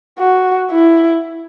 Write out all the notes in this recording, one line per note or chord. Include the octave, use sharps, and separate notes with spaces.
F#4
E4